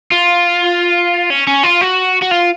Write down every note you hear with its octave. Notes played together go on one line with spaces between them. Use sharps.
F4
C#4
C#4
F4
F#4
F#4
F4